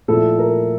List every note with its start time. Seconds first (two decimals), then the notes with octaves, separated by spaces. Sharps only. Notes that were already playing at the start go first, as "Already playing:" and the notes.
0.08 A#2 F3 A3 C4 E4 A4
0.39 A#4